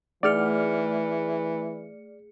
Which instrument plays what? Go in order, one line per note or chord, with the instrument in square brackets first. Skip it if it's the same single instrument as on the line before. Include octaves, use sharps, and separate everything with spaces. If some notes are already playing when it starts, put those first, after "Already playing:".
[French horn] E3 [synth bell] A3 G#4 C#7 [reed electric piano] D5 F6